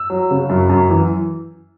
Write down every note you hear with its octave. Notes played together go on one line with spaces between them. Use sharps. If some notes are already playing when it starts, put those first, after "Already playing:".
Already playing: E6
F#3
C#3
F#2
F#2
E3